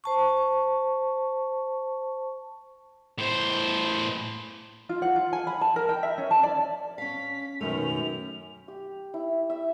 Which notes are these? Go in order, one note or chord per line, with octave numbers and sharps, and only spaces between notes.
C5 A5 C#6
A2 C5
F4
F#5
F4
G#5
B5
A5
A#4
G5
E5
C#4
A5
D5
C#4 F5 B6
F#2 B2 D#3 A3 F7
G4
E4
E5